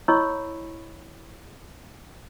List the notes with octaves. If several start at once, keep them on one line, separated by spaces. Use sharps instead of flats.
E4 C#5 D#5 B5 C#6 E6